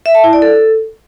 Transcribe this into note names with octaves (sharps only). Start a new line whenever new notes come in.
E5
A5
E4
D5
A4